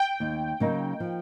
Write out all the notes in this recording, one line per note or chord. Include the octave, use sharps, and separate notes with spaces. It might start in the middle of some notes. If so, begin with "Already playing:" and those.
Already playing: G5
D#2
C#3 F#3 A#3 D#4
F3